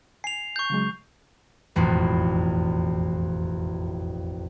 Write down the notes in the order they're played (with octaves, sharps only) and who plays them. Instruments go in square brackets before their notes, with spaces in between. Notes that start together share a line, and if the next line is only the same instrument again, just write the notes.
[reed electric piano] G#5 [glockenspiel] C7 F7
[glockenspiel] C#6 G6
[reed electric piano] C#3 F#3 G#3
[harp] E1 A1 F2